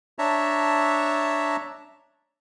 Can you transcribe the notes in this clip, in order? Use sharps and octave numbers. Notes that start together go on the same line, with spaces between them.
D4 C#5 E5 A5 A#5